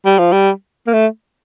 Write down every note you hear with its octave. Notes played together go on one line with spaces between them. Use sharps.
G3
F3
G3
A#3
A3